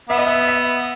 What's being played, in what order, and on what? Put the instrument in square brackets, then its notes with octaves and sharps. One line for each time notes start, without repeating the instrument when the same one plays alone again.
[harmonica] B3 [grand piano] E5
[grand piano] D#5
E5
E5